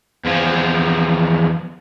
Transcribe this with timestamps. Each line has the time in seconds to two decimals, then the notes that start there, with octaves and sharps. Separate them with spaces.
0.25 E2 F3